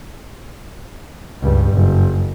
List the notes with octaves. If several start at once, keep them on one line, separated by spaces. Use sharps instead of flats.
C#2 G2
F#1